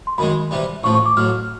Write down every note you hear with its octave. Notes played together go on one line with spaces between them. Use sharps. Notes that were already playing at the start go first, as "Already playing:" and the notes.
C6
F#2 D#3 G#3 B5
C3 E3 G3
A1 A2 F3 C#6
C#6
D6
A1 A2 F#3 F6